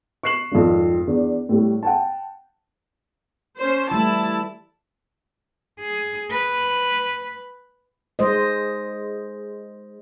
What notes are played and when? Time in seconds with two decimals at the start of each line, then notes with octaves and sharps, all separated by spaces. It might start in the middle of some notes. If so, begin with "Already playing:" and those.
0.23 C#6 F#6 C7 E7 F#7
0.52 G#1 F2
1.07 E2 D4
1.49 A2 G3 A3
1.83 F#5 G5 A5
3.58 C#4 C5
3.91 E3 G3 A3 E4 A5
5.80 G#4
6.30 B4
8.19 G#3 C5 D#5